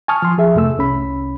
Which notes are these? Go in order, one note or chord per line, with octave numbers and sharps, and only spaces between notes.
G#5 A5 C#6 D#6 F6
F3 C6
F3 G#4 E5
F2 C3 A3 E6
C2 C#4 B5